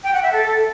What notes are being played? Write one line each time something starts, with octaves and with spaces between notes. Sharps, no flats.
G5
F#5
E5
A4